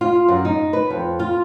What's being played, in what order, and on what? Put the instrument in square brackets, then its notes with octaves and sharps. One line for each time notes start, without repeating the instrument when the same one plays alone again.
[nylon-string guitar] F4
F#2
D#4
B4
F2
F4